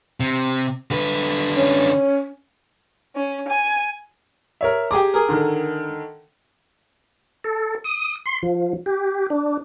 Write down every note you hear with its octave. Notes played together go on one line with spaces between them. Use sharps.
C3
D3 B4
C#4
C#4
G#5
A#4 C#5 E5
G4 G#4 G5 A#5 D6
G#4 A#4
D3 D#3
A4
D#6
C6
F3
G4
D4